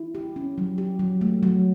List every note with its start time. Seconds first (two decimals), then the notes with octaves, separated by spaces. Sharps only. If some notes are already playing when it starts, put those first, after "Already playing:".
Already playing: E4
0.15 G4
0.36 C#4
0.58 F#3
0.78 G4
0.99 F#3
1.21 A3
1.43 F#3